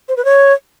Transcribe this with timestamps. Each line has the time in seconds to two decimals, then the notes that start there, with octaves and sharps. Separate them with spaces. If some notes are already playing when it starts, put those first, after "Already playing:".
0.09 C5
0.17 B4
0.25 C#5